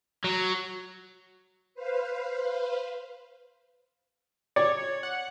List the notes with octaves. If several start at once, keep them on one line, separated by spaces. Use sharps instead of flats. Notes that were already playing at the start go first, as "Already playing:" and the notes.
F#3
B4 C5 F5
C#5 D5
F#5